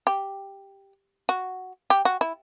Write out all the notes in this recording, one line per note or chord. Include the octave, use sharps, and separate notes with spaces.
G4
F#4
G4
F#4
E4